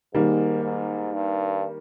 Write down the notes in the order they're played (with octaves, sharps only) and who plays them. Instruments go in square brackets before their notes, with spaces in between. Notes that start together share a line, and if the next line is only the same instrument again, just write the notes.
[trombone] G#2 [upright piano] D#3 G3 A#3
[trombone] G#2
G2